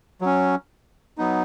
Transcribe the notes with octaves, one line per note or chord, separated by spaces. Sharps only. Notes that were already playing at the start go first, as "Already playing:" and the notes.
F#3 C#4
F#3 B3 D#4